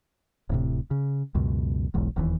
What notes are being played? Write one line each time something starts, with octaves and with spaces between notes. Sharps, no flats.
D1 A2 C3
C#3
C#2 F#2 B2
E1 B1 E2 G#2
E1 D#2 A#2 E3